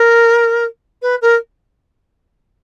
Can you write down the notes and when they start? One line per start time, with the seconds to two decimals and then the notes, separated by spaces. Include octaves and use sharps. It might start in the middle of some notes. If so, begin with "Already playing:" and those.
Already playing: A#4
1.02 B4
1.21 A#4